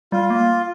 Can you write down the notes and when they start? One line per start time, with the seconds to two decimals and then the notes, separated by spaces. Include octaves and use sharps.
0.12 G3 F4
0.30 A#3